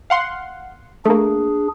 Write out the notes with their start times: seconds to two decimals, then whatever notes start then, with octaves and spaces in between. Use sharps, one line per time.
0.10 F5 F#5 C6
1.05 A3 A#3 D4 G#4